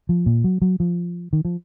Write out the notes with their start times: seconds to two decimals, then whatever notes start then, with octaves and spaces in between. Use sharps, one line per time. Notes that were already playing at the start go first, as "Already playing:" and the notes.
0.09 F3
0.26 A#2
0.44 F#3
0.62 F#3
0.80 F3
1.33 D#3
1.45 F3